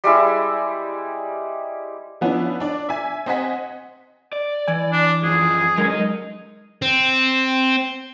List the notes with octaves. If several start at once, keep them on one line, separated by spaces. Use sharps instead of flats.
G3 G#3 E4 E6
F3 B3 C#4 D4 E4
D4 D5
E5 G#5
C4 C5 D#5 F#5 G#5 B6
D5
E3 G#5
D4
F#2 F3 G#4
F#3 G#3 C#4 D#4 A#4
D#4
C4